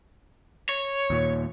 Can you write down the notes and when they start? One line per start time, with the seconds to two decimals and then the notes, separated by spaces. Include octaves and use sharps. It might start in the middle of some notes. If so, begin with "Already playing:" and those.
0.69 C#5
1.10 D#2 A#2